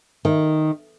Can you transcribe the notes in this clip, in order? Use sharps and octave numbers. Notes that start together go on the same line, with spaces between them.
D#3